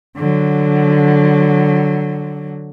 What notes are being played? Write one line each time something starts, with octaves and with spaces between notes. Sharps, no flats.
D3 F#3